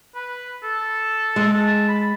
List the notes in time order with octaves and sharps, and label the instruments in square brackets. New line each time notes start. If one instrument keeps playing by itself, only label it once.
[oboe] B4
A4
[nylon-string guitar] G#3
[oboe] A5
B5